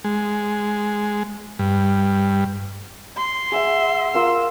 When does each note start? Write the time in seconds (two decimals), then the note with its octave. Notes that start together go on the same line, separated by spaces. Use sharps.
0.04 G#3
1.59 G2
3.17 C6
3.52 G#4 E5 F#5
4.14 F4 A#4 F5 E6